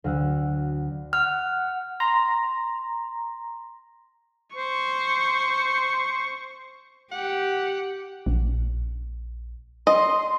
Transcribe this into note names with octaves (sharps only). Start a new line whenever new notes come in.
D2 F#3 F5 F#5 E6 F#6
F#5 F6
A#5 C6
C5 C#6
G4 F#5
A#1
D#5 C6